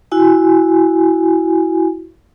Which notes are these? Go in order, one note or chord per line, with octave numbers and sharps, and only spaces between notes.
E4 F#4 G#5